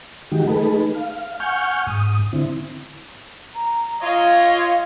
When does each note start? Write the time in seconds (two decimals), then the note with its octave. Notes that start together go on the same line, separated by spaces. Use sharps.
0.32 D#3 E3 G#3 D#4 F#4 G4
0.47 A3 D#4 G#4 A4 B4
0.95 F5
1.40 F#5 G#5 C#6 F6 G6
1.87 G#2 D#6
2.33 D3 C4 E4
3.55 A#5
4.01 F4 C#5 D#5 F5